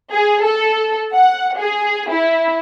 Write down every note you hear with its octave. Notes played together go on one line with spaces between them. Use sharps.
G#4
A4
F#5
G#4
E4